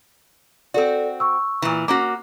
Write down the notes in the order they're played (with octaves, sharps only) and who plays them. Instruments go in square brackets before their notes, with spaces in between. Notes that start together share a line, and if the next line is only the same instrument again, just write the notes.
[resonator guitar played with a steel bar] C4 F#4 [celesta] A4 D5
[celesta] C#6 E6
[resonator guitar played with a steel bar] A#2 E3
[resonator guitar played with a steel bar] A#3 C#4 F#4 [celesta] D6